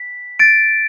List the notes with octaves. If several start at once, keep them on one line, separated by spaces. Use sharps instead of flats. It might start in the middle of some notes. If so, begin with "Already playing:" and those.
Already playing: B6
A6 D7